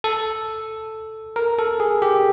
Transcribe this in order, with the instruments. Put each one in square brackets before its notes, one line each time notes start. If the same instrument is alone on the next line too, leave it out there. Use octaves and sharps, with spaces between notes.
[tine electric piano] A4
A#4
A4
G#4
G4